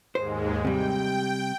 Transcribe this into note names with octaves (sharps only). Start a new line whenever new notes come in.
D#2 G#2 G#3 C5
C3 G3 G5